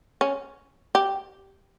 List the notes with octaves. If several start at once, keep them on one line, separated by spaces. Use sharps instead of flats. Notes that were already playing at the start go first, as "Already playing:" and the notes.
C#4
G4